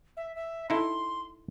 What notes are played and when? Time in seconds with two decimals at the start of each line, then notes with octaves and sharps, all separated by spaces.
0.17 E5
0.36 E5
0.70 D#4 E4 A4 C6